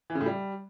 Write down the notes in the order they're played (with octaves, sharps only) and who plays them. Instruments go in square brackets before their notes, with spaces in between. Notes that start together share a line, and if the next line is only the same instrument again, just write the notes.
[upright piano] E3
C#3
A2
G3